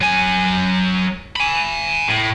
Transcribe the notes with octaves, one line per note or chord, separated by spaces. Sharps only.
F#3 G#5
G#5 B5
A2